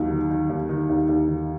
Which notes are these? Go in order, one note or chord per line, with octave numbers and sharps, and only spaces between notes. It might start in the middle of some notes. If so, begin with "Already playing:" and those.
Already playing: D#2 D#3 F#3
D#3
D#3
D#2
D#3
D#2
D#2
D#3